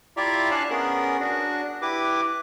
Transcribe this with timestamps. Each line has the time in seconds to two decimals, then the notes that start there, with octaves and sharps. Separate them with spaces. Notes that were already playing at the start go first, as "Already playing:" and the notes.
0.17 E4 F4 G4 D5 E5 A#5
0.51 D4 C#5 F5 G#5 A5 F#6
0.70 B3 C#4 G#4 A#4
1.20 D4 F#4
1.82 E4 G4 B4 D6